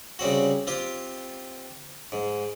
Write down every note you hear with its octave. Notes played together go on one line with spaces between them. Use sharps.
C#3 G3 C4 F#4
C4 F4 G4
G#2